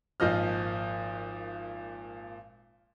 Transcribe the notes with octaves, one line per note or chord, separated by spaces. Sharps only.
G#1 A#2 F3 D#5 F6